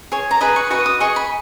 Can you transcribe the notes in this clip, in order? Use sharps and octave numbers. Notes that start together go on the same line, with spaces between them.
G#4 C#5
A#5
G#4 B4 D#5 B5
C#6
F#4 B4 D#5 C#6
D#6
G#4 D#5 C#6
B5